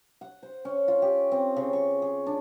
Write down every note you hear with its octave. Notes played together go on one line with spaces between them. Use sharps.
F#5
C5
C#4
F4
G4
C4
C#3
C#6
G#4
D4